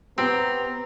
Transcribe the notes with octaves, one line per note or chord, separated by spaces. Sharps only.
B3 C4 G4 A#5